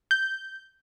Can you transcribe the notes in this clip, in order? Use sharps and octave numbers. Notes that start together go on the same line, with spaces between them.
G6